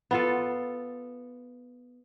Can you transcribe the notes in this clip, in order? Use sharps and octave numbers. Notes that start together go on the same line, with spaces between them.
B3 F4 A4